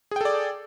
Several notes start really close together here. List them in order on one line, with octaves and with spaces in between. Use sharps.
G#4 G5 A4 D5